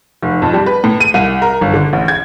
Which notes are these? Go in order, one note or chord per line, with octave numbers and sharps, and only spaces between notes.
F1
F2
G3
B4
A2
D#7
C2
A#4
G1
D3
A1
G#6